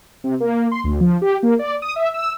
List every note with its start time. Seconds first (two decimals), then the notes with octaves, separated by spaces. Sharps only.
0.24 C3
0.40 A#3
0.72 C6
0.84 D2
1.01 F3
1.22 G4
1.43 A#3
1.59 D5
1.82 D#6
1.96 E5
2.14 E6